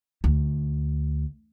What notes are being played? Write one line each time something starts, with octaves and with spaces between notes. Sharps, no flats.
D2